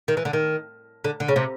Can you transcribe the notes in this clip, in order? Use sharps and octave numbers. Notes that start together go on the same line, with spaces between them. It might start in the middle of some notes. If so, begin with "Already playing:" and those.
D#3
E3
D3
D#3
D3
D3
C#3
C3